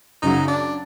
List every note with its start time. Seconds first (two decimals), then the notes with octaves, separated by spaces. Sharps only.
0.22 F#2 C#3 F#3 D#4
0.48 D4